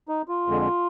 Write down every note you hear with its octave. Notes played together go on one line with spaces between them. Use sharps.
D#4
F4
F2 D3 G#3